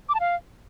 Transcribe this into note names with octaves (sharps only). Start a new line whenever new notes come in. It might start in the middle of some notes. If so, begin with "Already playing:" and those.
D6
A5
F5